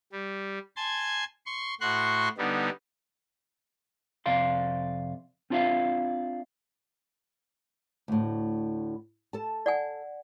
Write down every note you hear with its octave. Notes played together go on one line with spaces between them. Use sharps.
G3
G#5 A5 C6 G#6
C6 C#6
A2 F#4 C6 C#6 F#6
D3 G3 B3 D#4
F2 C3 D5 F5 C6
C4 D4 F4 D5 E5 F5
D2 A2
A4 A5
D5 F#5 G#5